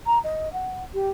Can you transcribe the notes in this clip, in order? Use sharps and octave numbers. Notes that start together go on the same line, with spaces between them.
A#5
D#5
F#5
G4